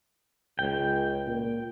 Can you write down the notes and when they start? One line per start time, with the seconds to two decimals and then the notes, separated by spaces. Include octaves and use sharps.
0.59 C#2 G5
1.27 A#2